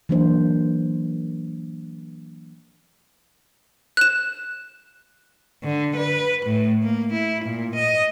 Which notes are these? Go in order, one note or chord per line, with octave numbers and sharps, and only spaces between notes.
E3 F#3 A#3 D4 C5
F#6 E7
D3
B4
A2
A#3
E4
A#2
D#5